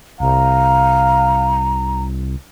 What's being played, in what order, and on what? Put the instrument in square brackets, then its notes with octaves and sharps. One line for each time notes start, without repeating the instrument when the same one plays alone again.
[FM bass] C2 [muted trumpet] F5 [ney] A#5